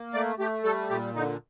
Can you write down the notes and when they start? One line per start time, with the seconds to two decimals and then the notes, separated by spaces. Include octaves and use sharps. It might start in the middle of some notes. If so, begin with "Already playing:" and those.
Already playing: A#3
0.14 A3 D5
0.39 A3 G4
0.64 G3 A4
0.89 A#2 G4
1.15 D3 D#4